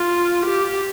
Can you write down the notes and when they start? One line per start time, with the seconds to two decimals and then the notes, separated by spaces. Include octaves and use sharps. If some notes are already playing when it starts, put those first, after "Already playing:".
Already playing: F4
0.46 G4